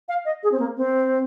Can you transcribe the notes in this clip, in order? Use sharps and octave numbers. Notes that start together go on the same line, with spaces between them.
F5
D#5
G#4
C4
A#3
C4